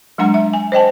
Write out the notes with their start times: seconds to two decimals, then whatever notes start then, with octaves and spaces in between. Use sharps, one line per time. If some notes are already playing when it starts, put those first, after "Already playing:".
0.18 F#3 G#3 D4 F#5 A#5
0.34 E5
0.53 G#5
0.72 C5 D#5 G5 A5